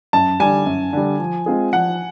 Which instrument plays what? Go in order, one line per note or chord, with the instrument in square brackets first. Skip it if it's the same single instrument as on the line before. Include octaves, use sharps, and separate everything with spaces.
[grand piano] F#2 [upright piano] A5
[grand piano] D3 G3 [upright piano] G#5
[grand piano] F#2
D3 G3
F3
G#3 C4 F4 G#4
[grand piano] F3 [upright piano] F#5